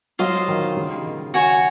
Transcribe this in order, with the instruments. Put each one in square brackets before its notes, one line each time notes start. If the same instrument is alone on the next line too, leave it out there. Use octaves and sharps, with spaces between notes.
[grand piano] F#3 [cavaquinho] F4 C5 D#5
[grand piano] D#3
C#3
D#3
[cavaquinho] F#4 C#5 G#5